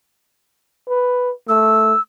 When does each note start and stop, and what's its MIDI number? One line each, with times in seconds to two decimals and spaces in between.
0.88 1.31 71
1.48 1.93 57
1.48 2.00 88